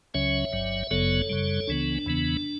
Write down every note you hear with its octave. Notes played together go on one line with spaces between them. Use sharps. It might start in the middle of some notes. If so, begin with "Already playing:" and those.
C#2 C#3 F#3 C#4 C#5 E5
G1 G2 F#3
G1 F#2 C#3 F#3 B3 A4 C#5
F#2 C#3 G3
C#2 C#3 E3 B3 D4
E2 C#3 E3 B3